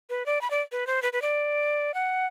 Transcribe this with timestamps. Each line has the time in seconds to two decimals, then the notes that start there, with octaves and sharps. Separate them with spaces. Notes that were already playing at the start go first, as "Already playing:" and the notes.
0.10 B4
0.26 D5
0.41 B5
0.51 D5
0.72 B4
0.87 C5
1.02 B4
1.13 B4
1.22 D5
1.94 F#5